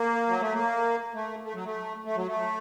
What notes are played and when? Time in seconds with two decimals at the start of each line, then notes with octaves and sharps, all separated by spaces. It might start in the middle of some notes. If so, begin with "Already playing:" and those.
Already playing: A#3
0.28 F#3
0.41 A3
0.54 A#3
1.14 A3
1.44 A3
1.54 F#3
1.65 A3
2.05 A3
2.16 F#3
2.27 A3